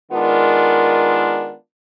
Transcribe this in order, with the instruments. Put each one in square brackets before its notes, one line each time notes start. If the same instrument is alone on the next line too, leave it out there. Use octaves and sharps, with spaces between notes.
[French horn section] D#3 G#3 B3 D4 F4 A#4